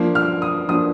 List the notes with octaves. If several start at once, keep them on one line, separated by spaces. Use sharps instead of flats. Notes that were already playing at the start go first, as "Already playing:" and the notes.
Already playing: F3 A#3 D4
F6
D#6
F3 A#3 D4 D#6